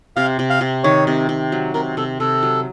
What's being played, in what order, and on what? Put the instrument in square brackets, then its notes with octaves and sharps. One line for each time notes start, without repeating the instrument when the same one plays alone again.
[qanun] C3 [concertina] F5
[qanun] C3
[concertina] F5
[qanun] C3
[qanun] D#3 [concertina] C#5
[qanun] C3
C3
F#3
[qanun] C3 [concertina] A#4
[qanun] C3 [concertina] A4
[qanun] C3 [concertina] A4
[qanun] F#3